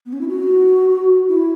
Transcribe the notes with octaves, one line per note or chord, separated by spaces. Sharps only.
B3
C#4
E4
F#4
E4